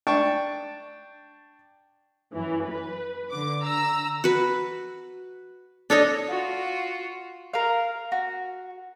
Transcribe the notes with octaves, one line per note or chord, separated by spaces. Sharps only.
D4 G5 A5 C#6
F#2 E3
B4
D3 D6
A#5 E6
F#4 B4
D4 A4 C#5 D#5
F4 F#4
A#4 F5
F#4